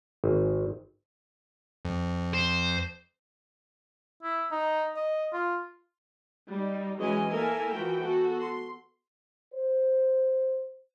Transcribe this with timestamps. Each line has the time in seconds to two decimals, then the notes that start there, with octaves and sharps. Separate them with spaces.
0.24 G#1
1.85 F2
2.33 C5
4.23 E4
4.51 D#4
4.96 D#5
5.33 F4
6.50 G3 D#4
6.99 E3 F#3 G#3 C#4 D#5 G#5
7.31 A#3 E4 A4 A#4 E5 G#5
7.73 E3 F3 F#4 G5
8.03 B3 F#4 A4
8.39 C6
9.54 C5